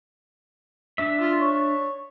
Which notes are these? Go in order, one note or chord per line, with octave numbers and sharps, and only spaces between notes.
D4 E5
F4
C#5